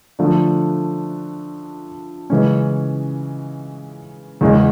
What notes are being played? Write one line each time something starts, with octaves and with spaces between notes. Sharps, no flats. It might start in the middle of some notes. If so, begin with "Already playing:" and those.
D3 F3 A3 D4
C#3 E3 G#3 C#4
E2 C#3 E3 G#3 C#4